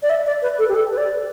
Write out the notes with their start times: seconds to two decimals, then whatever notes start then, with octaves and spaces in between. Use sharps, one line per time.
0.03 D5
0.10 E5
0.26 D5
0.42 B4
0.58 A4
0.69 G4
0.75 A4
0.92 B4
0.97 D5